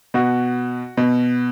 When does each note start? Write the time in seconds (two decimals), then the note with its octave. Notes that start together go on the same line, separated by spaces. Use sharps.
0.14 B2 F#4
0.97 B2